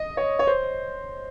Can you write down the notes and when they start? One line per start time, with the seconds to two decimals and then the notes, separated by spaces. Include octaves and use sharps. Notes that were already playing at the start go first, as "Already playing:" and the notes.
Already playing: D#5
0.17 C#5
0.39 C#5
0.47 C5